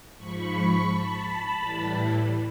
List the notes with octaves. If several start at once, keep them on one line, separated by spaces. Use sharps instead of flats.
G#2 F3 B5 C#6
A5 B5
A2 E3 G3